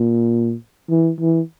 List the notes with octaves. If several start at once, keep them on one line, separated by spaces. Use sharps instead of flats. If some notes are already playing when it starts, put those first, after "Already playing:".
Already playing: A#2
E3
E3